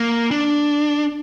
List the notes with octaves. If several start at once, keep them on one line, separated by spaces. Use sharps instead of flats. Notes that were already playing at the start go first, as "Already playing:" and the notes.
Already playing: A#3
D4